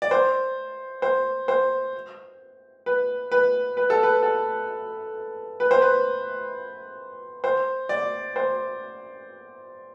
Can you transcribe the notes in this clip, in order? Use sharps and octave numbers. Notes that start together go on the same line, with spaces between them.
D5
C5
C5
C5
B4
B4
B4
A4
B4
A4
B4
C5
B4
C5
D5
C5